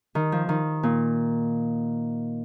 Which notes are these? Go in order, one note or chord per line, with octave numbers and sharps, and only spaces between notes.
D#3
F3
D#3
A#2